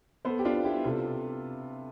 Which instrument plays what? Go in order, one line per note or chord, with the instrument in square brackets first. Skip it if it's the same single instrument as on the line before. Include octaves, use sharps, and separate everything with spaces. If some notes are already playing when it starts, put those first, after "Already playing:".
[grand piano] B3 A4 C5
G4
D4 F4
B3
E4 G4
C3 F4 A4